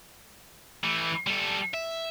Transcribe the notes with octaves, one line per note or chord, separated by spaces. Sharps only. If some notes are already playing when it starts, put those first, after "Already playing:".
E3 A3
G3 A4
E5